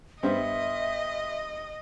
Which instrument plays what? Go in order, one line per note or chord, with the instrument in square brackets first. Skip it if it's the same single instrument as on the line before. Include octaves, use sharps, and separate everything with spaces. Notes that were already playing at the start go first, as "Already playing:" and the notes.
[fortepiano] G2 B3 C5 [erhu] D#5 [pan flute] E5